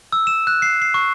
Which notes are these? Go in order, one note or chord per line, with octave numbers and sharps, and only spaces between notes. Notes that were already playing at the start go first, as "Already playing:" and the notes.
E6
E7
F#6
C7
C7
C#6